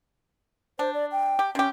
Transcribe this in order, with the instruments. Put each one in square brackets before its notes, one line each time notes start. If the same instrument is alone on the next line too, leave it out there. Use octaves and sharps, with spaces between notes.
[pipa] D4 [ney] C5
[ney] D5
G5
[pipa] G4
[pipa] C3 G4 [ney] C#4